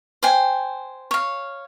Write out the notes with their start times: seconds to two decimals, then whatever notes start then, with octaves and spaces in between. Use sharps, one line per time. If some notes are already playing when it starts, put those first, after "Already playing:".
0.23 C5 G5 G#5
1.11 C#5 F5